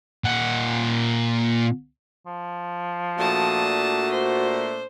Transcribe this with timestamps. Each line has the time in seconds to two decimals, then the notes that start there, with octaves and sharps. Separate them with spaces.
0.24 A#2 F#5
2.26 F3
3.19 A#2 A3 D4 F#4 A5 D#6
4.12 C5